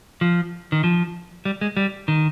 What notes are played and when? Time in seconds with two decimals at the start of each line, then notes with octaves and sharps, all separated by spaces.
0.21 F3
0.72 D#3
0.84 F3
1.45 G3
1.61 G#3
1.77 G3
2.08 D#3